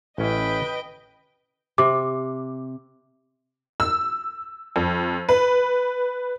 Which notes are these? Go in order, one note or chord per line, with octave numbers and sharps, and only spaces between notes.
A1 C#4 B4 D#5 E5 G5
C3 D6
E6
F2
B4